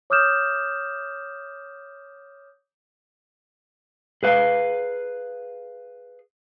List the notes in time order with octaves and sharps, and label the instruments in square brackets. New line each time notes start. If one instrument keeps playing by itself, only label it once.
[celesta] C#5 D6 D#6 F6 G6 E7
[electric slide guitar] G#4 B4 F5